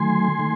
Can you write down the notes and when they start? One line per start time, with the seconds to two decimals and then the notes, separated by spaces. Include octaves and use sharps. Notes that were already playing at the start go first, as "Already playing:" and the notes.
Already playing: D#3 F#3 A3 G#5 C6
0.39 D#3 A3